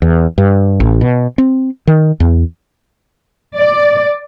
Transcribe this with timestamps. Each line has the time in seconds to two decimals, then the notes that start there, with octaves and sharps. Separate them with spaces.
0.02 E2
0.38 G2
0.80 A1
1.01 B2
1.38 C4
1.87 D#3
2.20 E2
3.57 D5